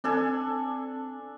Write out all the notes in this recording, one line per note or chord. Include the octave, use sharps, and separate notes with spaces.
C4 D4 A4 G#5